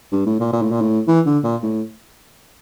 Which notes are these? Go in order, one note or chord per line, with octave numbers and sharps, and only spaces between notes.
G2
A2
A#2
A#2
A2
A#2
A2
E3
D3
A#2
A2